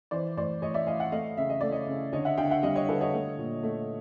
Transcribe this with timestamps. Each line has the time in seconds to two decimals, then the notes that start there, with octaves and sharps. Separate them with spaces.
0.11 E3 C5 D5
0.37 A2 C5 D5
0.62 A2 C#5 D#5
0.74 D5 E5
0.87 A2 D#5 F5
1.00 E5 F#5
1.12 A3 D#5 F5
1.37 C#3 E5
1.49 D#5
1.61 A3 D5
1.71 C#5 D#5
1.87 C#3
2.13 D3 C#5 D#5
2.25 E5 F#5
2.37 D3 F5 G5
2.50 E5 F#5
2.63 G3 D#5 F5
2.75 C#5 D#5
2.89 D3 A4 B4
3.01 C#5 D#5
3.14 A3
3.38 A#2
3.63 A3